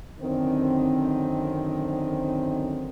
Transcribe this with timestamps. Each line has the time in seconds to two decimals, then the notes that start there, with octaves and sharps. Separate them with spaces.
0.21 F#2 D3 D#3 C4